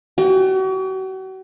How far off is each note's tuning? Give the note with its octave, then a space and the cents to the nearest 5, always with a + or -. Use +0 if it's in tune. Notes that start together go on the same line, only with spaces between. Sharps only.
F#4 +40 G5 +35